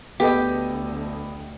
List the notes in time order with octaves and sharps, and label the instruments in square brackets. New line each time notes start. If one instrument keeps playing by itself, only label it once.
[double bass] D2 [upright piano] B3 A4 D#5 [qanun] G4